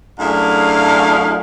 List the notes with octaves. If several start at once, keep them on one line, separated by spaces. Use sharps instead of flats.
F#2 A3 D4 E4 G#4 F5